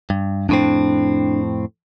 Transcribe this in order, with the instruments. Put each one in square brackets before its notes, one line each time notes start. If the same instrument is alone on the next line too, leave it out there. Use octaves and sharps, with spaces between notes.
[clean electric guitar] G2
[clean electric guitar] F2 A2 C4 [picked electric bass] D4